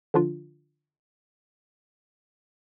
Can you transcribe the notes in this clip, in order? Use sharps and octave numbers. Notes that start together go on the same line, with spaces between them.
D3 F3 D4 F4